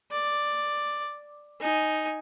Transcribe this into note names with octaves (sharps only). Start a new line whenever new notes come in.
D5
D#4 G#5